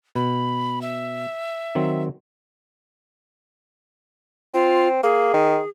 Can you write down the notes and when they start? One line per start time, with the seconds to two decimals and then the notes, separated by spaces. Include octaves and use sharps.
0.15 B2 B5
0.82 E5
1.75 D#3 F#3 C4
4.54 C4 F4
5.03 A#3 G#4
5.33 D#3